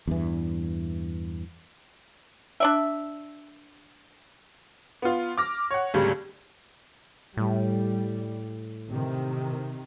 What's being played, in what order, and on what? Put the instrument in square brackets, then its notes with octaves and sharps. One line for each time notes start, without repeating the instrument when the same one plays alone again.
[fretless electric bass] E2 G2 E3
[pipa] D4 D5 E5
[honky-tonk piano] B3 F4
D6 F6 A#6
C#5 F#5
G#1 D2 C#3 G3
[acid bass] A2 [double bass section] G3
[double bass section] C3 D#3